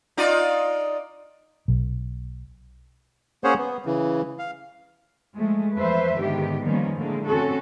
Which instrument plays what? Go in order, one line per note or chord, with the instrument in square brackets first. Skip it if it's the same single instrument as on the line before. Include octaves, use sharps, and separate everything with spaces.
[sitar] D#4 F4 D5
[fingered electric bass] B1
[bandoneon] A#3 C#4 G#4 C5 C#5 F#5
B3
C#3 E3
F5
[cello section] F3 G#3 A3
E2 F3 A3 B4 C5 E5
G#2 D3 D#3 B3 G4
D#3 F3 G3 A#3 B3 C#4
A2 D3 G#3 A#3
C4 C#4 F#4 A4